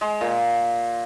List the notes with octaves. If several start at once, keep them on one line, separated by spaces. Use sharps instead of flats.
G#3
A#2